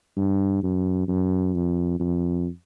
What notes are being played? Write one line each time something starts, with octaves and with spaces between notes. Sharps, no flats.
G2
F#2
F#2
F2
F2